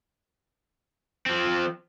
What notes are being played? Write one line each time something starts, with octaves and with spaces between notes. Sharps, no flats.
F3 C4